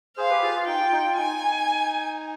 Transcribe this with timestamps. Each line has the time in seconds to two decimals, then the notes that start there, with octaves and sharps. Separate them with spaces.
0.17 G#4 C5 F5
0.30 G4 B4
0.42 F4 G#4
0.55 F4
0.67 D#4 G5
0.80 F4
0.92 D#4
1.05 F4
1.17 D#4 G#5